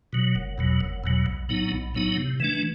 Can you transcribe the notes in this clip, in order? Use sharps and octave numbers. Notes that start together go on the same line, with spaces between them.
B2 F#3
F#1
E2 B2 F#3
F#1
E2 B2 F#3
B1
A2 F#3 B3 D#4
B1
A2 F#3 B3 D#4
C3
E3 A3 D4